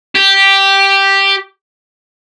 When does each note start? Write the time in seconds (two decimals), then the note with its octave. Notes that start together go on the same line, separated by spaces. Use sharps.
0.15 G4